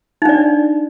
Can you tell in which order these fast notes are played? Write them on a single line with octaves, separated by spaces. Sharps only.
D#4 D4 D5